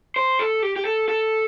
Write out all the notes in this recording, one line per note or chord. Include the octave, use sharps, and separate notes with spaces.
C5
A4
G4
G4
A4
A4